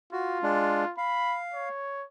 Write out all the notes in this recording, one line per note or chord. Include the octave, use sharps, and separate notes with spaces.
F4 F#4
G#3 D4
F5 B5
C#5